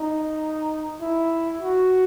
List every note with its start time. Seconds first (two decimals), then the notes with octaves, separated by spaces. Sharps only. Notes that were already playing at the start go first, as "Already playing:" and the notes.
Already playing: D#4
1.01 E4
1.61 F#4